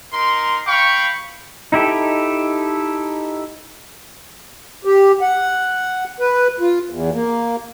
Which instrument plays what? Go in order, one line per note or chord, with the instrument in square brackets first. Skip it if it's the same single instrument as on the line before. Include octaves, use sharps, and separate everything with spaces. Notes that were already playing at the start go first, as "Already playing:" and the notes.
[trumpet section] D#4 A#4 C6
F5 G5 B5 C#6
[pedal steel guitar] D#4 E4 G4 A4
[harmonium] G4
F#5
B4
F4
E2
A#3